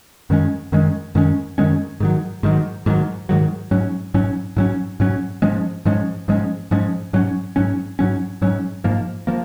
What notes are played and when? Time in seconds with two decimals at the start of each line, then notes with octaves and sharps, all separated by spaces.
0.30 F#2 D#3 G#3 C#4
0.72 F#2 D#3 G#3 C#4
1.15 F#2 D#3 G#3 C#4
1.58 F#2 D#3 G#3 C#4
2.00 G#2 D#3 F#3
2.43 G#2 D#3 F#3
2.86 G#2 D#3 F#3
3.29 G#2 D#3 F#3
3.71 G#2 F#3 C#4
4.14 G#2 F#3 C#4
4.56 G#2 F#3 C#4
5.00 G#2 F#3 C#4
5.42 G#2 F3 G#3 C#4
5.85 G#2 F3 G#3 C#4
6.28 G#2 F3 G#3 C#4
6.71 G#2 F3 G#3 C#4
7.13 G#2 F#3 C#4
7.56 G#2 F#3 C#4
7.99 G#2 F#3 C#4
8.42 G#2 F#3 C#4
8.84 G#2 F3 A#3
9.27 F3 A#3